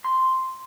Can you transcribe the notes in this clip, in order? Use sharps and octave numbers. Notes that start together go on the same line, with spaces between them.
C6